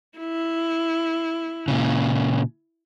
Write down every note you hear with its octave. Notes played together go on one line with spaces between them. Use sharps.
E4
A#2 C#3